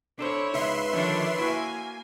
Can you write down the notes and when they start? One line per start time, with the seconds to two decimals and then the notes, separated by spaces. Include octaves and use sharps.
0.19 D4 E4 A4 C5 C#5
0.54 C#2 D#4 B4 E5 C6
0.93 D3 D#3 F3 D4 C#5
1.38 A#3 E4 F#4 C#5 G#5